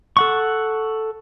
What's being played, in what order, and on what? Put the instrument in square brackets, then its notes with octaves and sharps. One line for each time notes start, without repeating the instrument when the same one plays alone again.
[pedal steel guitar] A4 F#5 C#6